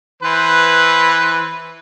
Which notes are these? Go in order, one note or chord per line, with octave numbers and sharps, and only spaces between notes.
E3 B4 C5